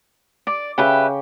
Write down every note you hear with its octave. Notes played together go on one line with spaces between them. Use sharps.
D5 D6
C#3 G4 B4 E5 G5